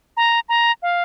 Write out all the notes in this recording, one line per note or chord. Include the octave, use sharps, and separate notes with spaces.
A#5
A#5
F5